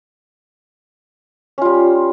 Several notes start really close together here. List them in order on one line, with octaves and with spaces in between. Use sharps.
C#4 F4 G3